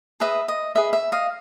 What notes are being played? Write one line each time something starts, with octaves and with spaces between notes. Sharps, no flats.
G#4 B4 D#5 E5
D#5
G#4 B4 D#5 E5
E5
D#5 F5